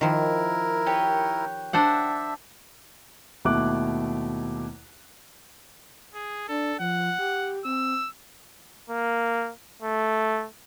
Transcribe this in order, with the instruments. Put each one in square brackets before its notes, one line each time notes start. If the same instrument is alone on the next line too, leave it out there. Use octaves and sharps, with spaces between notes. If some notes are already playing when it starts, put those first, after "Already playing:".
[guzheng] D#3 F3 [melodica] E4 A#4
[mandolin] G4 B4 C#5
[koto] D4 C5 F#5 [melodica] E5
[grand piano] D#2 B2 A3 E4 D6 F#6
[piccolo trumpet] G#4
[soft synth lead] D4 [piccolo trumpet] A4
[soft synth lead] F3 [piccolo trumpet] F#5
[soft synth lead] G4
[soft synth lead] C4 [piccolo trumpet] E6
[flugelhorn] A#3
A3